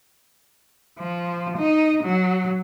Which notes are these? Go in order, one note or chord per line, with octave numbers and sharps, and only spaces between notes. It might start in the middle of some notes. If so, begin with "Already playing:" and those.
F3
D#4
F#3